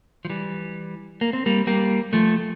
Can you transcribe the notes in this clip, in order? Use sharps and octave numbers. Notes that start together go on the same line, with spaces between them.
F3
E3 G3
A#3
C4
G3 A#3
G3 A#3
F3 A3